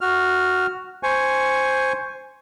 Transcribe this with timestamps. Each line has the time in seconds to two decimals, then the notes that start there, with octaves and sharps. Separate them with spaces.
0.01 F#4 F6
1.03 C5 G#5 C#6